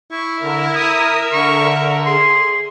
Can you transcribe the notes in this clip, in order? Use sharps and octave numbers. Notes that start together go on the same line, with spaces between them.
E4 C#6
D3 A#4 E5
D#6
D3 C#6
G#4 C6